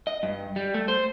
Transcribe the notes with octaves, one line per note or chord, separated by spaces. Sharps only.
D#5
G2
G3
A3
C5